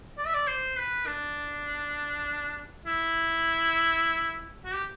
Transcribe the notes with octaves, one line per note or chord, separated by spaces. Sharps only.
D5
E5
D5
C5
B4
D4
E4
F#4
G4